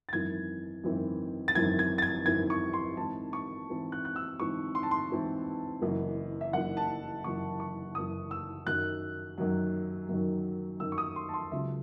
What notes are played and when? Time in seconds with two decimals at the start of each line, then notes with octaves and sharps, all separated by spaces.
0.09 A6
0.13 G#1 F#2 E3 C4 E4 G#6
0.83 G#1 F#2 E3 C4 E4
1.48 A6
1.55 G#1 F#2 E3 C4 E4 G#6
1.79 G#6
1.98 A6
2.02 G#6
2.26 G#1 F#2 E3 C4 E4 G#6
2.50 C#6
2.73 C6
2.97 G#2 E3 C4 E4 A5
3.33 C#6
3.68 G#2 E3 C4 E4
3.92 F#6
4.05 F#6
4.16 E6
4.39 G#2 E3 C4 E4 C#6
4.75 C6
4.83 A5
4.91 C6
5.11 G#2 E3 C4 E4
5.82 F#1 F#2 E3
6.41 E5
6.53 F#1 F#2 E3 F#5
6.77 A5
7.24 F#1 F#2 E3 C#6
7.60 C#6
7.95 F#1 F#2 E3 D#6
8.31 E6
8.66 F#2 D#3 F#3 F#6
9.38 F#2 D#3 F#3
10.09 F#2 D#3 F#3
10.80 F#2 D#3 F#3 E6
10.92 C#6
10.98 D#6
11.16 C6
11.29 A5
11.34 C6
11.51 C#2 C#3 F#3 E5